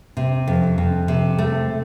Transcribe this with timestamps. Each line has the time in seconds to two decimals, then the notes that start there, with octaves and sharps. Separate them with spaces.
0.17 C3
0.48 F2
0.78 F2
1.08 C3
1.39 A3